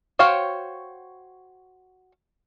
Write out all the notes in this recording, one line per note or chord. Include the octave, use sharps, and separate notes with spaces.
F#4 C5 C#5 F5 G5